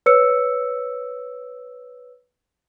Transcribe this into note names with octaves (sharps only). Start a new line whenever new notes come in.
B4 C#5 E6 C#7